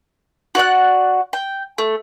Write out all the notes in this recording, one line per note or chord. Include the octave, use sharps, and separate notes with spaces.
F#4 D5 F#5 F#6
G5
A3